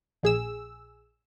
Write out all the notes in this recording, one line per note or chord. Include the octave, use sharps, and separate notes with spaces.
A#1 G#4 E6